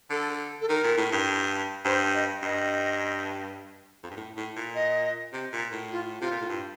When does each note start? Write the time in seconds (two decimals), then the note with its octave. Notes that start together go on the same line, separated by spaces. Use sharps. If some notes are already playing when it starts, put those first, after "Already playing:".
0.10 D3 A4
0.61 A4
0.69 D#3 A#4
0.83 A#2
0.97 A2
1.12 G2
1.85 G2 C5
2.14 D#5
2.42 G2 D#5
4.04 F2
4.11 G2
4.17 A2
4.37 A2
4.56 A#2
4.75 D#5
5.33 C3
5.53 A#2
5.72 A2
5.91 F4
6.21 C3 F4
6.31 A#2
6.41 A2
6.49 G2